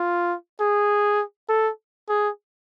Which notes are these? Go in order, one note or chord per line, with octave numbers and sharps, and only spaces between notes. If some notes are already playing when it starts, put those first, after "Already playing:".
Already playing: F4
G#4
A4
G#4